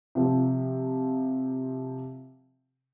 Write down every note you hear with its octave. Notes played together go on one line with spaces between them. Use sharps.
C3 F3